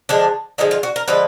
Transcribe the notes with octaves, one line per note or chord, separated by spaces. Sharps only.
D3 F3 G#3 D4
D3 F3 G#3 D#4
F4
F#4
A#4
D3 F3 G#3 B4